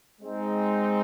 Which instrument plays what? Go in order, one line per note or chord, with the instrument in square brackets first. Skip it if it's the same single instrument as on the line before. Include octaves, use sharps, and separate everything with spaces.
[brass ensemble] G#3 C4 D#4